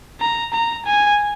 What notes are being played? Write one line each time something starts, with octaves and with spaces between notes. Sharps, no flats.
A#5
A#5
G#5